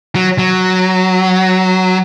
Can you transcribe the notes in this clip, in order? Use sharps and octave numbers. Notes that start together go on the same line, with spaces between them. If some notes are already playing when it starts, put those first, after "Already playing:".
F#3
F#3